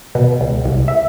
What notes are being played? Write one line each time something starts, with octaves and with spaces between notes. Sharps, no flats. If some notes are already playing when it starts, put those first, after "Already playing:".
B2
C#2
C2
E5